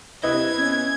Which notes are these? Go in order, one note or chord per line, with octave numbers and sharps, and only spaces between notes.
C3 E4 B4 D#5 G#6
B3 C#4